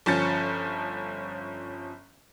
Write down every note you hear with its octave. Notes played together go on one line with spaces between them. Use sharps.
G1 F3 C#4 A6 C#7